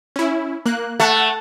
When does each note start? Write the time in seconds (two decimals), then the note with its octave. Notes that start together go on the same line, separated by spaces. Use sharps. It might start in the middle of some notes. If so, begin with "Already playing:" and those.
0.16 C#4 E4
0.66 A#3 F#6
1.00 A3 F#5 A5